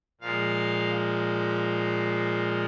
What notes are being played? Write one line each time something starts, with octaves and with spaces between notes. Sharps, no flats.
A#2 F3 G#3 F5